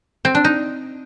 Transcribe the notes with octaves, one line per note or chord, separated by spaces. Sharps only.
C4
D4
D#4